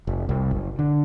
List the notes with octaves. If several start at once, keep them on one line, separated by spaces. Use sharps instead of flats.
F1
C2
F#1
D3